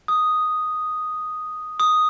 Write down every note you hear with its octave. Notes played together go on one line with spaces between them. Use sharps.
D#6
D#6